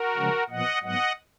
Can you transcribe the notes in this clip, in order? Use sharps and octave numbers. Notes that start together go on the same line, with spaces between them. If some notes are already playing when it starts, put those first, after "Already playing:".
Already playing: F#4 A#4
C#3 F3 G#3 C#4
A#2 F3 B3 D#5 F#5
G#2 F#3 B3 D#5 F#5